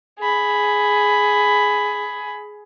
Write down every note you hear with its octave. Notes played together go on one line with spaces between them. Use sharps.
G#4 B5